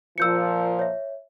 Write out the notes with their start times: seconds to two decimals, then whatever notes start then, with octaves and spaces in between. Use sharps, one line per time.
0.18 A#2 F3 E6 G6 C#7
0.79 C#5 E5